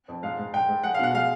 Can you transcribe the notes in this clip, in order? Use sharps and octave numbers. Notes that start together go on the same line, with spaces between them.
F2
G#2 F5
G#2
G#2 G5
G#2
G#3 F#5
F5
B2 F#5
G#3 F5